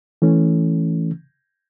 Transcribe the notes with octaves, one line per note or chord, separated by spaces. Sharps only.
E3 A3 C#4